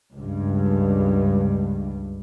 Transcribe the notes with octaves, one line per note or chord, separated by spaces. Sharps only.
C#2 G2